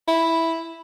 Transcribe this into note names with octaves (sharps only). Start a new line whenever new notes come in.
E4